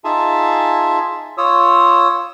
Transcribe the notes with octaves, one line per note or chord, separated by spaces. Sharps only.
D#4 F4 G#4 E5 G#5 A5
F4 C#5 D#6 E6